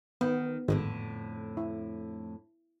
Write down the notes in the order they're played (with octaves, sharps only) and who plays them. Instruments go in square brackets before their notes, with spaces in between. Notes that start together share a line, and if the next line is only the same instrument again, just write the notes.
[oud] D#3 [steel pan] B3
[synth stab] G#1 [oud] F2 A2 D3
[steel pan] E4